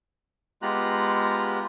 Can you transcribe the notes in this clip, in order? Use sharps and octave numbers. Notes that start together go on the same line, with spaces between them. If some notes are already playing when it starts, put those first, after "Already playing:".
G#3 B3 F4 G4 A#5 F#6